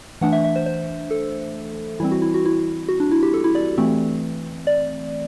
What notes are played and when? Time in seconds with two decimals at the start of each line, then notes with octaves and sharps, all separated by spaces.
0.21 E3 A3 D4 F#5
0.32 E5
0.45 E5
0.56 C5
0.66 C5
1.11 A4
2.00 E3 G3 C4 E4
2.11 F#4
2.22 E4
2.34 F#4
2.45 E4
2.89 F#4
3.00 D4
3.12 E4
3.23 G4
3.34 A4
3.44 E4
3.55 D5
3.78 E3 A3 C4
4.67 D5